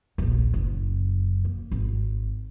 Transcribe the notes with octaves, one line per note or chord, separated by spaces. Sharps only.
D#1 A#1
F#1 F#2
A#3
G#1